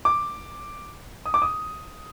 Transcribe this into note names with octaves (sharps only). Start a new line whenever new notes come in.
D6
D#6
D6
D#6